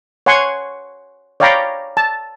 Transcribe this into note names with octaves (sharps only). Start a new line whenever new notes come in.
C#5 F#5 G#5 C6 C#6
C#5 D5 F5 G5 A#5 B5
A5